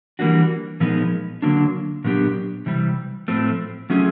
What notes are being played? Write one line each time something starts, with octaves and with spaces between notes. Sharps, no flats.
E3 G3 A#3 D4 F#4
A#2 F3 G#3 B3 D#4
D3 F#3 A#3 D4
A#2 F#3 B3 D4 G4
C3 E3 G3
A2 F3 A3 C4
F#3 A3 C#4 F4 G#4